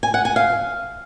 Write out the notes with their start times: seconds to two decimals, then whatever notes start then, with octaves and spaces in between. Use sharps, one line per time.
0.03 G#5
0.14 F#5
0.25 G#5
0.36 F5